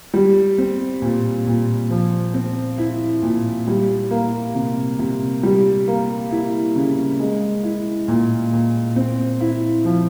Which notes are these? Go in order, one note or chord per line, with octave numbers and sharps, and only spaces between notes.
G3
C4
A#2
A#2
F3
C4
E4
A#2
G3
A#3
C3
C3
G3
A#3
E4
C#3
G#3
E4
A#2
A#2
C4
E4
F3